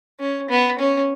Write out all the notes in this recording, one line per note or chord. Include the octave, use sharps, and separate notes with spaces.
C#4
B3
C#4